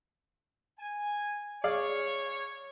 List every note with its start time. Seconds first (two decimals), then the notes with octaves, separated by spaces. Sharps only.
0.80 G#5
1.64 G#4 C#5 D5 F5